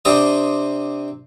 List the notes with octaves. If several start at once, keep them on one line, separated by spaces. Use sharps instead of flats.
C3 C4 D4 C5 G5 D#6